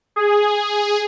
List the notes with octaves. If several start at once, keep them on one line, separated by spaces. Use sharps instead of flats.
G#4